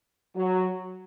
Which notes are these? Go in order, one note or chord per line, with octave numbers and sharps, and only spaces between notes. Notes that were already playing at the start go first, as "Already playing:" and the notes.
F#3